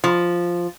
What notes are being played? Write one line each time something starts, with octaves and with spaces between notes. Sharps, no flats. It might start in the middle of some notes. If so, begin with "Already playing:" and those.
F3